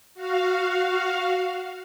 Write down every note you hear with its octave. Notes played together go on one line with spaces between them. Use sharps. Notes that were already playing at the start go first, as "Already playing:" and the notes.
F#4 F5